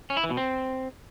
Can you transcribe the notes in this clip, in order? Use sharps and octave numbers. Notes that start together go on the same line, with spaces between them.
C#4
E4
E3
B2
C4